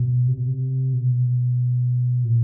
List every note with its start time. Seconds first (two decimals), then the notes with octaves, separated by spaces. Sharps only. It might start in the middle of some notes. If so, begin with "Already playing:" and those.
Already playing: B2
0.28 C3
0.38 B2
0.48 C3
0.93 B2
2.24 A#2